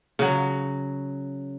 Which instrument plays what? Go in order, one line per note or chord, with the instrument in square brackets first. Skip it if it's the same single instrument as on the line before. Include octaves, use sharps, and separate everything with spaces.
[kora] C#3 F#3